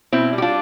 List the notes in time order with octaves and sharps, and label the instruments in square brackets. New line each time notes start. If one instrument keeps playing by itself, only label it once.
[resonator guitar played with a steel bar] B2 C4 E4
G3
G4
D4 F4